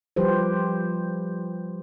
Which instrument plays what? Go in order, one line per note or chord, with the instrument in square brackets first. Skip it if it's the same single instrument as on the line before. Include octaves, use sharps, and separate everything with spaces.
[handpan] F3 G3 G4 B4 C5